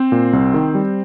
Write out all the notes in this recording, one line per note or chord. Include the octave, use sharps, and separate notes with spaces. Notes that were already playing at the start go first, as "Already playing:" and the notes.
Already playing: C4 C5
A#2
C2
D#3
G3